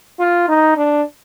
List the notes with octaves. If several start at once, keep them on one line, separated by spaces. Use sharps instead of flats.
F4
D#4
D4